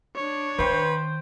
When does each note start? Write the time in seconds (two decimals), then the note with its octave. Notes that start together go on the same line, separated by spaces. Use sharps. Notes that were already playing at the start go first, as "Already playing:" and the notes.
0.16 D4 C#5
0.59 D#3 B4 C5 G5